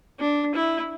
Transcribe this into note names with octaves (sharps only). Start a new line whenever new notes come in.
D4
E4